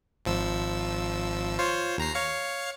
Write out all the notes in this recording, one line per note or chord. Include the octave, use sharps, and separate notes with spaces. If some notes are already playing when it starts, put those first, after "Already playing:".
G#1 F3 E6
F4 C5 C#5
D#2 A#5 C7
C#5 F5 C#7